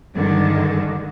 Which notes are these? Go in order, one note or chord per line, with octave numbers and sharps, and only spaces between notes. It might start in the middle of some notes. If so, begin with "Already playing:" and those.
G2 D3 D#3 G#3